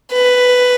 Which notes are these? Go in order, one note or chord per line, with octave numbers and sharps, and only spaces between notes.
B4